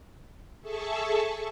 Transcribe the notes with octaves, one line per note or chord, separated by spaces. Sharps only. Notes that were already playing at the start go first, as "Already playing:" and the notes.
G#4 A4 E5 A5 C#6